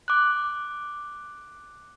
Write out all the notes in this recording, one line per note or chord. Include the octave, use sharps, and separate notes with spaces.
D6 F#6